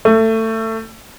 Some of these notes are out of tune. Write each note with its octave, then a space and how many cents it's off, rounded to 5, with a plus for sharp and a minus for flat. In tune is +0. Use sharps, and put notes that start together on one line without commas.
A3 +20